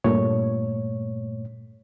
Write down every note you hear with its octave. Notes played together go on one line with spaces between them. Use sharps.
G2 A#2 A3 C#5